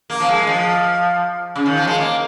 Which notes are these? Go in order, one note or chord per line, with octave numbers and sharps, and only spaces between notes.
A#3
F3
G#3
G#3
F3
C#3
D#3
F3
G#3
A#3